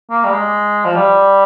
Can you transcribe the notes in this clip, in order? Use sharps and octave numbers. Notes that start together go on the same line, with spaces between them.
A#3
G3
G#3
F3
G3